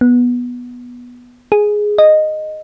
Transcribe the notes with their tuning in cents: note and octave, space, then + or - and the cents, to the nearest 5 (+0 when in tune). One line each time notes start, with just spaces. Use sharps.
B3 -10
G#4 +5
D#5 -10